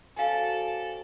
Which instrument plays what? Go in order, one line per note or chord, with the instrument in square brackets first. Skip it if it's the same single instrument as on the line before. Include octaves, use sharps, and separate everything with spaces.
[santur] F#3 C4 F#4 [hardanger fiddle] A4 D5 [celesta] F5 G#5